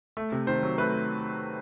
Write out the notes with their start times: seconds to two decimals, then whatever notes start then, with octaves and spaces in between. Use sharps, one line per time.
0.17 A3
0.32 C3
0.47 D#3 C5
0.63 F#3
0.78 A3 B4